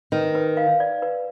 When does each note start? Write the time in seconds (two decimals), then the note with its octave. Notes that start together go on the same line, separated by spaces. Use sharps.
0.12 D#3 B4
0.35 B4
0.57 F5
0.80 D5
1.02 B4